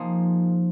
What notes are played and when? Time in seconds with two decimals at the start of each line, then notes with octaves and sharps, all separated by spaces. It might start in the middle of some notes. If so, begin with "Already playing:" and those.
Already playing: F3 A#3 D#4 G#4 C5